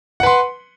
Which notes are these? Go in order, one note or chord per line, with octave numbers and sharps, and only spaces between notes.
B4 F#5 C6